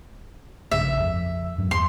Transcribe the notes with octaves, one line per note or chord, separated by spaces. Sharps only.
A#1 G2 C#3 E5
F2
G2 F#3
E2 C6